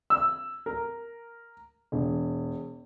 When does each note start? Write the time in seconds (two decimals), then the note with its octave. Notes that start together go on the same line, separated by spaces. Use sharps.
0.10 E6
0.66 A#4
1.92 E1